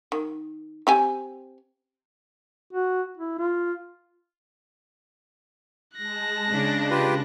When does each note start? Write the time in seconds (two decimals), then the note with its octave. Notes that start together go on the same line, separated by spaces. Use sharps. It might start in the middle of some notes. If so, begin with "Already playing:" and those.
0.12 D#3
0.87 C4 G4 G#5
2.73 F#4
3.17 E4
3.39 F4
5.97 G#3 A5 F#6 A#6
6.50 C#3 D4
6.91 F4 G4 B4